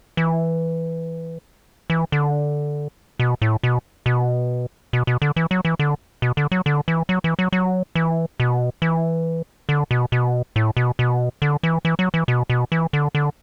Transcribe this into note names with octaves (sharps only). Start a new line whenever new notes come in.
E3
E3
D3
B2
A2
B2
B2
B2
B2
D3
E3
F#3
E3
D3
B2
D3
F#3
D3
E3
F#3
E3
F#3
F#3
E3
B2
E3
D3
B2
B2
A2
B2
B2
D3
E3
E3
F#3
E3
B2
B2
E3
D3
D3